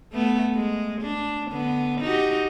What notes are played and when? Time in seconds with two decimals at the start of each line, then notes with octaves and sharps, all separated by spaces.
0.13 A3 B3
0.55 G#3
1.02 D4
1.51 D3 B3
2.01 D#4 F#4 G4